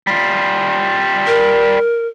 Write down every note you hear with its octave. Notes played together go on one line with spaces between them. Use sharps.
G3 F4
A#4